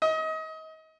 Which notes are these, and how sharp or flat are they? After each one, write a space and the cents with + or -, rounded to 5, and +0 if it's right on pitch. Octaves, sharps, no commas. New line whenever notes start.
D#5 +30